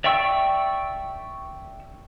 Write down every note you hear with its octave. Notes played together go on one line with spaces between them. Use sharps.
D5 E5 G5 C#6 E6